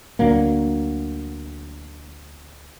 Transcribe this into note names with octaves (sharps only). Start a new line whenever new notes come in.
D2 D3 F#3 A#3